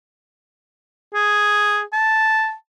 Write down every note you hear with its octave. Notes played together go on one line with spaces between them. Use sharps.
G#4
A5